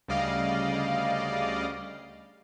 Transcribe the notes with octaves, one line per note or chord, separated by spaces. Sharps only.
D2 C#3 G3 D5 D#5 F5